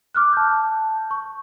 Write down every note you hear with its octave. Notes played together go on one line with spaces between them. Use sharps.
D6 F6 F#6
A5 G6
C#6